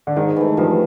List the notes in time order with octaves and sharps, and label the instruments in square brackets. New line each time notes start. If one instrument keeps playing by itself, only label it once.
[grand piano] D3
[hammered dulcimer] G#2 [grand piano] D#3
[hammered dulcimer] E3 A3
[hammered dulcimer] G2 [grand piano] F3